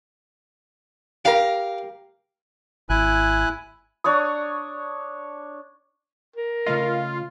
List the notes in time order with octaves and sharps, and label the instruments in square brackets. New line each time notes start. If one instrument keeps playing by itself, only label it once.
[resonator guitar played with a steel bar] G4 A#4 [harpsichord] F5
[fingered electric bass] G#1 [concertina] E4 G#5 F#6
[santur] D4 C#5 C#6 D#6
[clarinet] A#4
[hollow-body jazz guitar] C#3 A3 D#5 [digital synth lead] F4